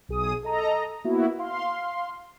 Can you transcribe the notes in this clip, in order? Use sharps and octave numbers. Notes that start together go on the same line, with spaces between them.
B1 G#4 D#6
A4 D#5 A#5
A#3 B3 E4 F#4
F5 C6